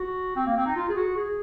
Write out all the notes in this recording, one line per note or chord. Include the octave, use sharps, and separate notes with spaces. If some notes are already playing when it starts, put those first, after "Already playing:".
Already playing: F#4
C4
A#3
C4
D#4
F4
G#4
F#4
G#4